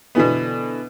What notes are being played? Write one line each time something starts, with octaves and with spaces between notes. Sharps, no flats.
B2 D3 E3 B3